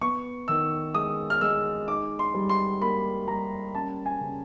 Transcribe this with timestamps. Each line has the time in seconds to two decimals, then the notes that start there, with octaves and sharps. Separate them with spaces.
0.01 B3 C#6
0.48 D#3 E6
0.94 G#3 D#6
1.30 F6
1.41 G#3 E6
1.88 D#4 D6
2.19 C6
2.34 G3
2.49 C6
2.81 A#3 B5
3.28 G3 A#5
3.75 C#4 A5
4.06 G#5
4.21 C#3